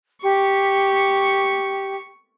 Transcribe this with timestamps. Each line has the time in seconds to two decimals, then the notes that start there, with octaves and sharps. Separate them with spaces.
0.23 G4 C#6